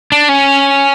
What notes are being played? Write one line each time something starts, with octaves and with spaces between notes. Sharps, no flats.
D4
C#4